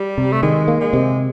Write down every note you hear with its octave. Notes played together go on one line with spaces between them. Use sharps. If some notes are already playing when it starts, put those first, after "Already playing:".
Already playing: G3
C3
A3
D#3 G#3
A#3
G#3
C3